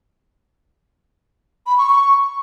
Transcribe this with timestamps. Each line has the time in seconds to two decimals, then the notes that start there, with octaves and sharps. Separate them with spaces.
1.67 B5
1.78 C#6
1.89 C#6